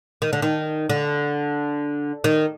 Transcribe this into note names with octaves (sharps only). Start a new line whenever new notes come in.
D#3
D3
D#3
D3
D#3